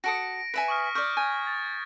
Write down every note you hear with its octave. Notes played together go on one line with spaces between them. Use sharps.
F#4 A4 D#6 A#6 C#7 D7
B4 E5 G#5 B6 D7
C#6 D#6 F6
D5 C#6 F6 G6
G#5 F6 G6 G#6
A6